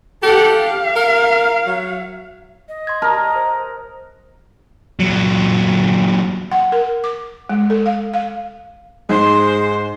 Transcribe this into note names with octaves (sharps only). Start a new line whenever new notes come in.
G4 A4 F#5
F5
A#4
F#3
D#5
C6 G#6
A#4 A5 D#6
C5
A#2 F#3
F#5
A#4
D6
G#3
A4
F5
F5
G#2 G#3 C5